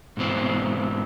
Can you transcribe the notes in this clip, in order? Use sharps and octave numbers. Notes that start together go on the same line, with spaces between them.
G#2 B2 E3 C4